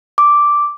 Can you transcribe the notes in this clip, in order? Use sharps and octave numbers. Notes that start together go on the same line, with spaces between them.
D6